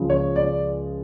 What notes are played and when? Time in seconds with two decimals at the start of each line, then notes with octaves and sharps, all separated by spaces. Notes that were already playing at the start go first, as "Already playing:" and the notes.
Already playing: C#2 C#3 F3 G#3
0.10 C#5
0.36 D5